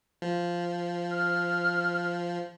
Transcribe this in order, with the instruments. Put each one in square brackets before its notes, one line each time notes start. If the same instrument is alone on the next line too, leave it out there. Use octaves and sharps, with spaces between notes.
[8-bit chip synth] F3
[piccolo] F6